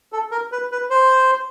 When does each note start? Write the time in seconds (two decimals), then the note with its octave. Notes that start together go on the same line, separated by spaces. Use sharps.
0.13 A4
0.32 A#4
0.52 B4
0.72 B4
0.90 C5